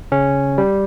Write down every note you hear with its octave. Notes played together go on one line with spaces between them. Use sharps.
C#3 C#4
G3